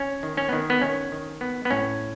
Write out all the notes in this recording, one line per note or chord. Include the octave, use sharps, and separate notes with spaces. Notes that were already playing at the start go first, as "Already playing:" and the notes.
Already playing: C#4
D#3
C#4
D#3 B3
B3
D#3 C#4
D#3
B3
B3
A2 C#4